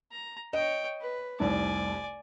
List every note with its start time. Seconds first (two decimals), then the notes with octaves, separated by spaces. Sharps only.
0.12 A#5
0.53 C#5 D#5 G5
1.01 B4
1.40 F1 C2 D5 G#5